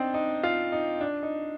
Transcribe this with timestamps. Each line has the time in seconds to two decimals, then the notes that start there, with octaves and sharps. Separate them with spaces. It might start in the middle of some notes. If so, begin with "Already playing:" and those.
Already playing: C4 D4 D#4
0.14 D#4
0.43 F4
0.72 D#4
1.01 D4
1.23 D#4